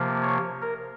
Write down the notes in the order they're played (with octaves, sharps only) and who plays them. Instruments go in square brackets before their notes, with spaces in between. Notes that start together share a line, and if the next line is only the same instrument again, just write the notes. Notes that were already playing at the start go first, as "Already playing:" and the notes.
Already playing: [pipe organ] C3 F3 A#3
C#5
A#4